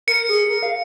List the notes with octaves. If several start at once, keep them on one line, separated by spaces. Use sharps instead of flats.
A#4 C#7
G#4
A#4
F5